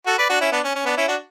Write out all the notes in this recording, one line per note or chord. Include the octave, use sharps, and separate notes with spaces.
F#4 A4
B4 D5
D4 F#4
C#4 E4
B3 D4
C#4
C#4
B3 D4
C#4 E4
D4 F#4